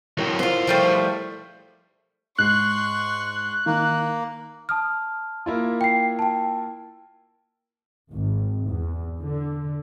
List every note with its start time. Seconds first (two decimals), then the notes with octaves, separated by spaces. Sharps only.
0.18 F#3 C4 E4 A#4
0.39 B1 F4 F#4 C5
0.67 F3 G3 A3
2.38 G#2 C6 C#6 F#6 C7
3.66 D#3 A#3
4.69 A5 D#6 F6
5.46 A#3 E4 F4
5.81 G5 C7
6.19 G5 A5
8.11 G#1
8.66 E2
9.22 D3